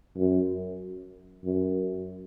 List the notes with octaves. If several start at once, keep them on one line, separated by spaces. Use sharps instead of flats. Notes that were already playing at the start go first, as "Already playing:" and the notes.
F#2
F#2